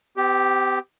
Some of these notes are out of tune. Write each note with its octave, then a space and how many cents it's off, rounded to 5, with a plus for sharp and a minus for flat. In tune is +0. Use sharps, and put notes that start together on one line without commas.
C4 -45 G4 +0